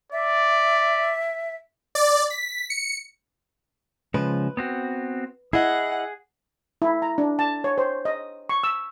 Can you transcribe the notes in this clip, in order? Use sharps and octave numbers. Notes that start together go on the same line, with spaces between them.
D5 E5
D5
B6
C#7
C#3 F3 G#3 B4
B3 C4 F#4
E4 G#4 D#5 F#5
E4
A#5
D4
A5
C#5
C5
D#5
C#6
E6